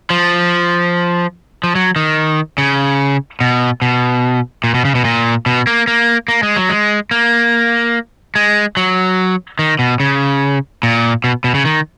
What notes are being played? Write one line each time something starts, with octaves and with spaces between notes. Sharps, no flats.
F3
F3
F#3
D#3
C#3
B2
B2
A#2
B2
C#3
B2
A#2
B2
A#3
A#3
A#3
G#3
F#3
G#3
A#3
G#3
F#3
D#3
B2
C#3
A#2
B2
B2
C#3
D#3